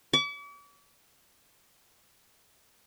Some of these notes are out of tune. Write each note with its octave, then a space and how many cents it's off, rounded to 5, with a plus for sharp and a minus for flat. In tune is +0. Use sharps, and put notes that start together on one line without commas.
D6 -45